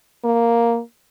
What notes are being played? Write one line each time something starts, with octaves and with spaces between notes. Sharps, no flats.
A#3